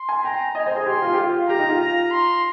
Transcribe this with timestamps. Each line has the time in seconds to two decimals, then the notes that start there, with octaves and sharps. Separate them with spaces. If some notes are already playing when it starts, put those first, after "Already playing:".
Already playing: C6
0.09 G#5
0.24 G5 A#5
0.55 D#5 G#5
0.66 C5
0.76 G#4
0.86 G4 C6
1.02 F4
1.14 G4
1.18 F4
1.48 G4 A#5
1.59 D#4
1.70 F4
1.80 A#5
2.11 C6